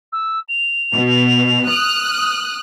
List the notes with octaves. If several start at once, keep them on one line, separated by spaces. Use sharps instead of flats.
E6
F7
B2
D#6 F6 F#6